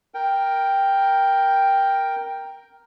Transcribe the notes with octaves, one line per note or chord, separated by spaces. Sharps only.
A#4 G5